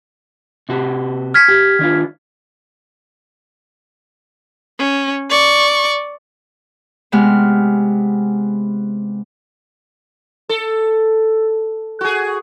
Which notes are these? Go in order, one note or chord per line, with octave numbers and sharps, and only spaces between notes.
C3 F#4 G4
F6 G#6 B6
G4
D#3 D4 F4
C#4
D5 C#6
C3 G#3 B3 F6
A4
F#4 G#4